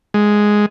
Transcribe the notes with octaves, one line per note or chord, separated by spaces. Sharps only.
G#3